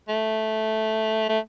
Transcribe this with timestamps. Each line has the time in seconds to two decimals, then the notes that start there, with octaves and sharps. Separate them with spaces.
0.09 A3
1.29 A3